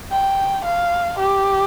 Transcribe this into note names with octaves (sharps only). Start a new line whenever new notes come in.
G5
F5
G4